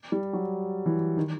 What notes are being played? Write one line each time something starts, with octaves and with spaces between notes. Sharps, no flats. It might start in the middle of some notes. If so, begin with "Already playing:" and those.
G3
F#3
E3
D#3